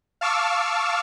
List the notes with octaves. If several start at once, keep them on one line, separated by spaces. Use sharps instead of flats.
F5 A5 C#6 D6 E6 F6